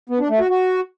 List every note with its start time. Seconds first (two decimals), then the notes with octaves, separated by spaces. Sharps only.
0.10 B3
0.20 D4
0.30 A3
0.40 F#4
0.50 F#4